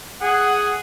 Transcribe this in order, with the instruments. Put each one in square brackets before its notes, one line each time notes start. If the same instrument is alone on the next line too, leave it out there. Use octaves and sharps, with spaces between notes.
[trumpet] G#4 [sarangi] F#5